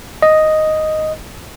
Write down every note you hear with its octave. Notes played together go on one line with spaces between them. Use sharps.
D#5